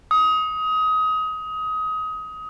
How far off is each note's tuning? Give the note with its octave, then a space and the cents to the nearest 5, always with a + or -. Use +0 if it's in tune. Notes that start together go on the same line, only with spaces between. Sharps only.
D#6 +25